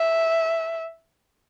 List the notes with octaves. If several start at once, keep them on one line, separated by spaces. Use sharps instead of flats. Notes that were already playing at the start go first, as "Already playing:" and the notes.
Already playing: E5